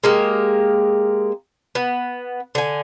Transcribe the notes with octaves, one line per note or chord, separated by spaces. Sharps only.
G#3 A#3 G4
B3
D3 G#5